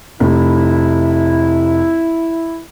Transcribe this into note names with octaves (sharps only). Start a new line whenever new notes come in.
F1 E4